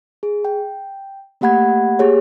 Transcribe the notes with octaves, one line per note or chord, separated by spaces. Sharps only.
G#4
G5
A3 A#3 G4 F#5 B5 G#6
A#3 G4 G#4 C#5